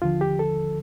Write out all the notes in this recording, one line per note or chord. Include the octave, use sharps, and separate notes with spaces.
D#2 D3 F3 F4
G4
A4